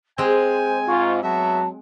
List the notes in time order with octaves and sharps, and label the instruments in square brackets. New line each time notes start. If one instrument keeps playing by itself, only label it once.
[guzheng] G#3 C4 [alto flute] C5 [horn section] G#5
[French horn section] G#2 F4 [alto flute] C#6
[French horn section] F#3 [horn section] B3 F#4 E5 [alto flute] A5